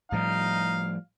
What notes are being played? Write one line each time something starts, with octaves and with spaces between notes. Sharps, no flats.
A2 F3 G3 D#4 F5